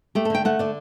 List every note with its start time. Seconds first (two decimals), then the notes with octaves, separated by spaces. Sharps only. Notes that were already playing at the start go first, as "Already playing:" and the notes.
0.15 A3 G4
0.25 A4
0.30 D3 G5
0.45 A3 F#5
0.59 D3 D5